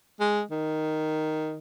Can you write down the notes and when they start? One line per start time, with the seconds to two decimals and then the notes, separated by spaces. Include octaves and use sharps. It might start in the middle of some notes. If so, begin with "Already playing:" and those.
0.20 G#3
0.51 D#3